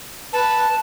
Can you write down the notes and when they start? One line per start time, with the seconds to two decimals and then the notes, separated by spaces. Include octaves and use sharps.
0.33 B4 A5